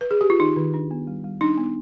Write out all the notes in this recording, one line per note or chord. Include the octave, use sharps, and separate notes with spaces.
B4
G#4
G4
F4
D#3 D#4
D#3
D4
B3
G3
G3
D4 D#4
B3